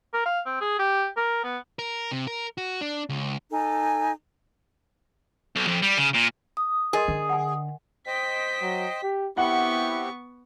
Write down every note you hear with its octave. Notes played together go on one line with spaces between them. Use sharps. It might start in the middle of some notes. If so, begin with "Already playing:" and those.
A#4
F5
C4
G#4
G4
A#4
B3
A#4
C3
A#4
F#4
D4
C#2
D#4 A4 G#5
B1
F2
G3
C#3
A#2
D#6
G#4 A#4 D#5 C6
D3
F#5 G#5
C5 D#5 G5 B6
F#3
G4
B3 C4 E4 G4 F#5 C#6